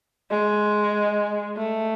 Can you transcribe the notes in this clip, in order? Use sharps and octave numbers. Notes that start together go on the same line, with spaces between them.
G#3
A3